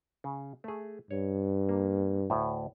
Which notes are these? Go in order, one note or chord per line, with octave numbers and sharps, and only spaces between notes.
C#3
A3 G#4
G2 C#5
A#3
D2 A2